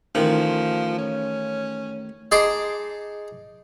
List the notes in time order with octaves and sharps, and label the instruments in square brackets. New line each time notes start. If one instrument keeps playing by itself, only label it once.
[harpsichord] A1 D#3 [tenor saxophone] F3
[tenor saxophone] C#4
[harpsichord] D#4 G#4 D#5 A5 C6 D6